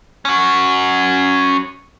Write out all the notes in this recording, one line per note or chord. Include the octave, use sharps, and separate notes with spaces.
C#4 F#4